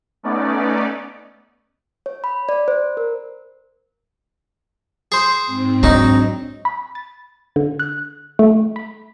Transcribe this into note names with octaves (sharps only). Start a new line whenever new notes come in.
A3 B3 C#4 D#4 D5
C#5
B5
D5
C5
A#4
G#4 C5
G#2 C4
F#3 D4 D#4
B5
A6
D3
F#6
A3
B5